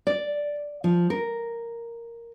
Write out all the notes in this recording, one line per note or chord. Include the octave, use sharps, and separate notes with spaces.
D5
F3
A#4